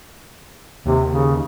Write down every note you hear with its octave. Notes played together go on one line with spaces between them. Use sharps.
D#2 C3
C#3